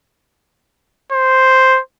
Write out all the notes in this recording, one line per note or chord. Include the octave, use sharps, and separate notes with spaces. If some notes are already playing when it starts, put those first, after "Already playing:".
C5